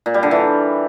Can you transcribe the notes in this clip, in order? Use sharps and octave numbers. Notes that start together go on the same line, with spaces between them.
A#2
G3
D3
E3